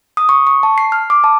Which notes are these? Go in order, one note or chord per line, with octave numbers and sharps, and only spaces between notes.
D#6
C#6
C#6
A5
C7
F6
D6
A5